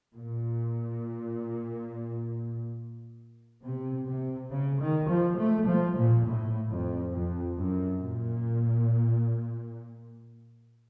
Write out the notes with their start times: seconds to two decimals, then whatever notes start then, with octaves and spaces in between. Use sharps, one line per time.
0.14 A#2
3.64 C3
4.07 C3
4.51 C#3
4.80 D#3
5.09 F3
5.38 A3
5.67 F3
5.97 A#2
6.26 A2
6.70 F2
7.12 F2
7.57 F#2
8.01 A#2